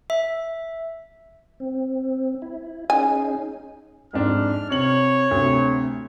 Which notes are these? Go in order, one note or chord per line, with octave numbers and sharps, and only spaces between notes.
E5
C4
E4
C#4 D#4 G#4 G#5
F2 G#2 D4 F6
C3 C#5 F#7
D2 C3